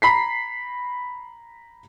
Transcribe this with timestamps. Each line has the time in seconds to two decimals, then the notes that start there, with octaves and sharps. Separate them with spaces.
0.02 A#5 B5 B6 C7